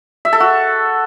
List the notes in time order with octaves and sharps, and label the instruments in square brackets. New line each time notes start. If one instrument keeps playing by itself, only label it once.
[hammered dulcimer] E5
A4
F#4